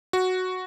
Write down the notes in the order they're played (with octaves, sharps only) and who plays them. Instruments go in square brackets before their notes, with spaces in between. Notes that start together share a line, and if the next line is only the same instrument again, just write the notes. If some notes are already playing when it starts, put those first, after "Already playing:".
[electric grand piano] F#4